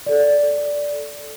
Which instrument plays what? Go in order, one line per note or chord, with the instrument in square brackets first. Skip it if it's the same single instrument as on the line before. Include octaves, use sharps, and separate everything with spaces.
[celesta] A4 D5